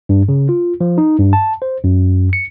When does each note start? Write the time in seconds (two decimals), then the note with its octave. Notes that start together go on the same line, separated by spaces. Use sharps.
0.09 G2
0.29 C#3
0.49 F4
0.81 F3
0.98 D#4
1.19 G2
1.33 A5
1.62 C5
1.84 F#2
2.33 C#7